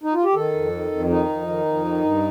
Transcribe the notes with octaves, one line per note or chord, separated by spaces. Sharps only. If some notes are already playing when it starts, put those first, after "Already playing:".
D#4
F4
G4
D#3 A4
F2
D#3
F2
D#3 D#4
F2
D#3
F2
D#3
G2